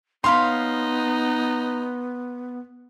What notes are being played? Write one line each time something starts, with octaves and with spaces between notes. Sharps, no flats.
B3 D#4 C#5 F5 B5 C6